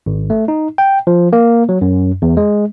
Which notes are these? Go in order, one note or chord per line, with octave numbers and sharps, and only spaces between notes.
G#1
A3
D#4
G5
F3
A#3
F#3
F#2
E2
G#3